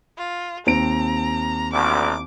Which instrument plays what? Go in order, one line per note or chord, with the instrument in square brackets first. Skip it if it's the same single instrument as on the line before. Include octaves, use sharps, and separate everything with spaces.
[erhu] F4
[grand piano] D#2 C4 D7 [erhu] A#5
[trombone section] A1 D2 [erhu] D6